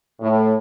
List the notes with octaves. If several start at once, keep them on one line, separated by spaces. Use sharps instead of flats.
A2